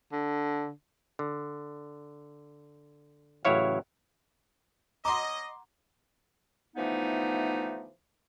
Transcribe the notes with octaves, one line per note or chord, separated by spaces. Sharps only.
D3
D3
A1 C#3 F#3 E4 C#5 F5
C#4 D#5 F#5 A#5 C6 D6
D3 E3 F3 A3 B3 D#4